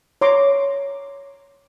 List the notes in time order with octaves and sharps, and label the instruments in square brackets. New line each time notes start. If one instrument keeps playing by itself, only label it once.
[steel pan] C#5 A#5 C6 D6